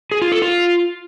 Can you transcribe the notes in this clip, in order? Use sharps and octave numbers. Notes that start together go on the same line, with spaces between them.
G#4
F4
A4
F4